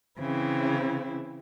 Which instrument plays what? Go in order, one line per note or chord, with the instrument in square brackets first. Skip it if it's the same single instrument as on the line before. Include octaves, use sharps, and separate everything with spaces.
[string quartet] C#3 E3 C4 E4